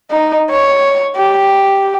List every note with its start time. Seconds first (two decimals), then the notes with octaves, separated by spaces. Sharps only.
0.10 D#4
0.50 C#5
1.16 G4